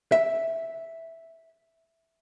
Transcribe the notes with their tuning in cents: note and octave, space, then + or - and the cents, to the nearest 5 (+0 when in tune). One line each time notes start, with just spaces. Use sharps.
E5 -5